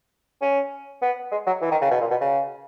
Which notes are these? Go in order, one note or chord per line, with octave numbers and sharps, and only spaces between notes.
C#4
B3
G#3
F#3
E3
D#3
C#3
B2
A#2
B2
C#3